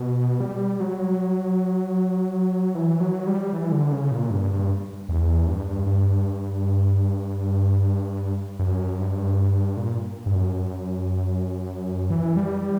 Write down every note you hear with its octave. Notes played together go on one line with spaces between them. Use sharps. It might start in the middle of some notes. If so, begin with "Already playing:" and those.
Already playing: B2
G3
F#3
E3
F#3
G3
E3
D3
C#3
A#2
G2
E2
G2
G2
F#2
G2
A#2
G2
F#2
E3
G3
G3